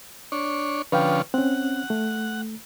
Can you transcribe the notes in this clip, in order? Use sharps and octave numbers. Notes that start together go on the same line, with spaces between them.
D4 C#5
D3 F3 C#4 B4 F5 G5
C4 C#4 F#5
A3